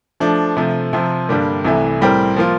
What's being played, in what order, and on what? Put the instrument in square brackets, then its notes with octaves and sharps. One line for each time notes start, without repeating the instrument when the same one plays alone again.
[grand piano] F3 A3 D4
C3 F3 A3
C3 F3 C4
G2 D3 G3 A#3 D4
C2 C3 E3 A3
A2 G3 C4 G4 A#4
F3 A#3 F4